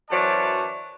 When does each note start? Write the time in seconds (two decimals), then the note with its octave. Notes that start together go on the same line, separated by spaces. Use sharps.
0.10 F#2 E3 F#3 C5 D5 A5